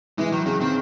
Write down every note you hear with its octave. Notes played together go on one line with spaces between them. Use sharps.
E3 G#3 E4
D#3 F#3 D#4
C#3 F#3 C#4
D#3 C4